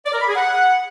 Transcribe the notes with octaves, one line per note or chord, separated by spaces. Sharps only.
D5
A#4
B5
G#4
F#5